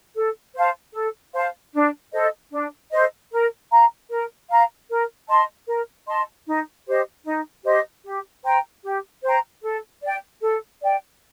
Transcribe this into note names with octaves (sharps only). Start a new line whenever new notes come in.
A4
C5 F5 A5
A4
C5 F5 A5
D4
A4 C5 D#5
D4
A4 C5 D#5
A#4
F5 A#5
A#4
F5 A#5
A#4
D#5 A5 C6
A#4
D#5 A5 C6
D#4
G4 C5 D#5
D#4
G4 C5 D#5
G4
C5 G5 A#5
G4
C5 G5 A#5
A4
D5
G5
A4
D5 G5